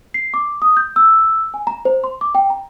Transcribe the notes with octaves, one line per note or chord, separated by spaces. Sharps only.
C7
D6
D#6
G6
E6
G#5
A#5
C5
C6
D6
G5
A#5